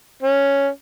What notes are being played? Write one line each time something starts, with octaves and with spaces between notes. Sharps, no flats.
C#4